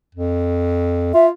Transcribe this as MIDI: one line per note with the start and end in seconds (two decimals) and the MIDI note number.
0.15 1.12 41
1.14 1.30 65
1.14 1.26 76